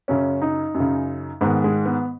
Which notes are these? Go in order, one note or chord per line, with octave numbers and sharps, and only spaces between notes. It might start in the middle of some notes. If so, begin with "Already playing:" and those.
F#2 C#3 C#4
D#4
F#2
C#3
G#2 D#3 B3
G#3
B3